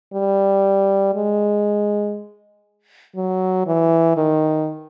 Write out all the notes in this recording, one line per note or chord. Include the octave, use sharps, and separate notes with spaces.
G3
G#3
F#3
E3
D#3